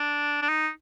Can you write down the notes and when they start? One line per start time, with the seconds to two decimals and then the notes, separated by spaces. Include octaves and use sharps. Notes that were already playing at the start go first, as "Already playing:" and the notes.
Already playing: D4
0.42 D4
0.49 D#4